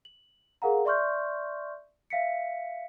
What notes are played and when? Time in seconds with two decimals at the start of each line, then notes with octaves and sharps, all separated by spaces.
0.05 F#7
0.62 G#4 A#4 F5 F#5 A#5
0.85 D5 E5 C6 C#6 F6 G6
2.10 E5 F5 B6 C#7